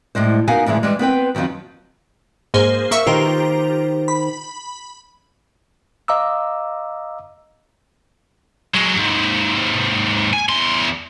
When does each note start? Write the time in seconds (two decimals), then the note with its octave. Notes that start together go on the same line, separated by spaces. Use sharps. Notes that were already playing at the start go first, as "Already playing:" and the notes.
0.15 A2 G3 G#3 C5
0.48 B3 D#4 F#4 A#4 F5 G#5
0.66 D2 A2 E3 G#3 E5
0.83 E3 G3 G#3
0.99 B3 C4 B4 G5
1.35 F2 D#3 F#3 C4 F4
2.54 G#2 A#3 G#4 C5
2.91 A#3 E5 C#6
3.07 D#3 F4 G4 C5 A#5
4.08 B5
6.08 D#5 F5 A#5 D6 E6
8.74 F#3 G#3
8.96 D#2 G#2
10.33 G#5
10.49 E2 C6